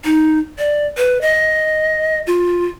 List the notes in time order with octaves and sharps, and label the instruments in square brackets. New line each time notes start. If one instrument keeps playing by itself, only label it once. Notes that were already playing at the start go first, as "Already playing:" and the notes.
[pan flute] D#4
D5
B4
D#5
F4